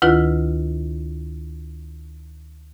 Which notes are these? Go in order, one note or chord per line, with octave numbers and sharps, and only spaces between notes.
D2 D#3 E4 F4 B4